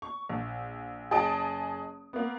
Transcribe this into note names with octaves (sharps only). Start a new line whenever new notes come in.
C#6
A#1
F#1 G#4 D#5 A5 D#6 D7
A#3 B3